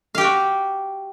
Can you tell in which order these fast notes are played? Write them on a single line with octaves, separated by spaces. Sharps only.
F5 G4 G5 F#4